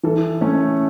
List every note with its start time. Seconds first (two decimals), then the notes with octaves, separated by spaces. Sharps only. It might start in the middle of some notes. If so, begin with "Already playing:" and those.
0.03 E3 A4
0.41 A3 C#4 C#5